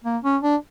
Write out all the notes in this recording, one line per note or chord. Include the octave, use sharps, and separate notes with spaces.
A#3
C#4
D4